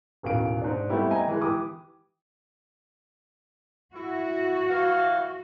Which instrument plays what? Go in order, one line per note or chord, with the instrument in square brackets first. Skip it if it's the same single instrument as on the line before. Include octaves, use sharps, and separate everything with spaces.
[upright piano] D#1 A1 B2 F5 D7
G#2 D4
G3 A3 B3 C4 E4 G4
D#5 G5 G#5 A#5
E3 G#3
E3 G4 D6 D#6
[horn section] E4 [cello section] F#4
[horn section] E3 F5